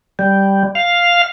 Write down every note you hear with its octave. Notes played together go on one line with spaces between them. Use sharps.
G3
F5